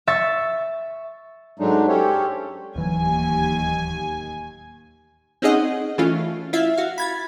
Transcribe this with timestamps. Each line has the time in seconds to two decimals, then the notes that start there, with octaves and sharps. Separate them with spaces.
0.07 E5 C#6 A6
1.59 G#2 F#3 G#3 A3 D4 D#4
1.88 C#4 G4 A4 C5 C#5
2.76 D1 D#2 E3 F#3 G#5
5.42 C4 C#4 D#4 G#4 D#5 F#5
5.98 E3 A3 C#4 F4
6.53 E4 F4 E5 F5
6.77 F#4 F5
6.98 B5 G#6 A6